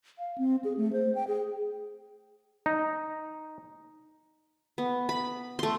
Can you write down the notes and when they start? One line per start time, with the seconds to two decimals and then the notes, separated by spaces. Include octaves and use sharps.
0.18 F5
0.38 C4
0.64 G#4
0.77 A3
0.93 C5
1.15 G5
1.28 G#4
2.66 D#4
4.78 B3
5.09 B5
5.59 A3 C6